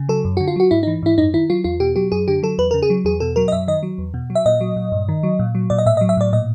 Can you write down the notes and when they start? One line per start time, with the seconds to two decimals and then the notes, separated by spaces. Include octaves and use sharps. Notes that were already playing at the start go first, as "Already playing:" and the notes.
Already playing: C#3
0.09 F#3 A4
0.25 F#2
0.37 F#4
0.40 D3
0.47 F4
0.56 F#3 F#4
0.71 G#2 E4
0.83 D#4
0.87 E3
1.03 G#2 E4
1.18 F#2 D#4
1.34 D#3 E4
1.50 F#3 F4
1.64 E2 F4
1.80 B2 G4
1.96 F#3 G4
2.12 F#2 G#4
2.28 D3 G4
2.43 F#3 A4
2.58 E2 B4
2.71 C#3 A#4
2.82 G#4
2.90 F#3
3.05 E2 G#4
3.20 B2 A4
3.36 F#3 A#4
3.48 D#5
3.52 F#2 E5
3.68 D#3 D#5
3.83 F#3
3.98 E2
4.14 B2
4.30 F#3
4.35 E5
4.46 A#2 D#5
4.61 F#3
4.76 A#2
4.92 G2
5.09 D#3
5.23 F#3
5.39 A#2
5.55 F#3
5.70 A#2 D5
5.78 D#5
5.86 A2 E5
5.97 D#5
6.01 F#3
6.09 E5
6.17 A2 D5
6.33 A#2 D#5